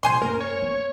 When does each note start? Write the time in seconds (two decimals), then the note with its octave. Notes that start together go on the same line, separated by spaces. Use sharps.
0.03 C2 A#2 C5 G#5 C6
0.22 F#2 A#3 A#4
0.41 C#5
0.62 B3